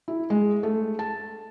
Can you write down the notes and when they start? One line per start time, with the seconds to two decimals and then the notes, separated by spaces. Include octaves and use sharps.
0.08 E4
0.30 G#3
0.63 A3
0.99 A5